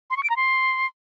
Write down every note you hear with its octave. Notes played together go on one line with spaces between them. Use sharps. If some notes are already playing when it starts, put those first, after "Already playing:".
C6
C#6
D7
A#5
C6